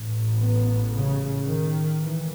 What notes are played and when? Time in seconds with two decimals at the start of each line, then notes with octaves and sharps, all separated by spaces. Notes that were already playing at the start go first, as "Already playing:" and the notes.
Already playing: A1 A2
0.40 B3
0.93 C#3
1.46 D#3
1.98 C#2 C#3 E3